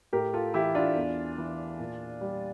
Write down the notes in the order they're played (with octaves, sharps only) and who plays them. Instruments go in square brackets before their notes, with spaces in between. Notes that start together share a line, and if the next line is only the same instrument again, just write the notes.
[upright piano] A2 G4 A#4
F4 A4
E3 E4 G4
D4 F4
E2
E3
A#2
G3